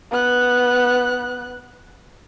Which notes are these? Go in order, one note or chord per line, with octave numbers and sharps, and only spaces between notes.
B3 F#6